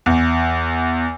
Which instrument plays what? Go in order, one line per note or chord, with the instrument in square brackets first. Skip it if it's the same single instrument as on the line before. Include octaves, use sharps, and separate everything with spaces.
[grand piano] E2